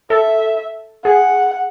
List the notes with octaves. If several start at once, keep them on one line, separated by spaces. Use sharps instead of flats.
A4 E5
G#4 F#5